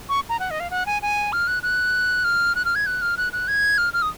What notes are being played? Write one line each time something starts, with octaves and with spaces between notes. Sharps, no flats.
C#6
A#5
F#5
D#5
F5
F#5
G#5
G#5
F6
F#6
F#6
F6
F#6
F6
G#6
F#6
F6
F#6
F#6
G#6
F6
F6
D#6